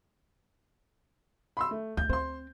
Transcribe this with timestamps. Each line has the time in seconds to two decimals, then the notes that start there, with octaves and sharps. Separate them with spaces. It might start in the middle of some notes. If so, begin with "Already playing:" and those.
1.57 B5 C6 E6
1.71 A3
1.97 D2 G6
2.09 C4 C5 C6